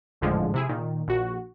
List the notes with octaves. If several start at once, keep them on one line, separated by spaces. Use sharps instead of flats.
G#1 F2 A2 D3 F3 G#3
C3 E4 G#4
A#2 D#3
A#1 F#4